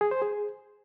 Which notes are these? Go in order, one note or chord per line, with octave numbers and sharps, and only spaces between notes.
G#4
C5
G#4